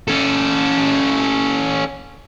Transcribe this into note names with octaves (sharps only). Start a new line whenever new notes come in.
C#4 A4